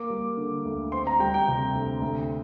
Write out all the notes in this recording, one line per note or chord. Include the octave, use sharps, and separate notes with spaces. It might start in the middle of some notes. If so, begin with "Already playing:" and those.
Already playing: A#3 D6
G3
D3
D2
C4 C6
A#5
G3 G5
G5
C3
D2
D2